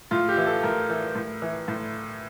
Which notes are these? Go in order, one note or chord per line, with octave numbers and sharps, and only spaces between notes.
A2 F4
G4
E3
A4
A2 A#4
E3
A2
E3
A2